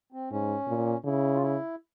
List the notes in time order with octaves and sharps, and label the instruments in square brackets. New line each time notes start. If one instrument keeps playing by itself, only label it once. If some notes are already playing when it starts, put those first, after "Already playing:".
[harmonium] C4
[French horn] G#2 [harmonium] C#4
[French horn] A#2
[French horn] C#3 [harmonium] E4
[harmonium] F4
E4